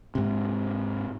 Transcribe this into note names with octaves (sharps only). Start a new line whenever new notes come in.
G#2 C3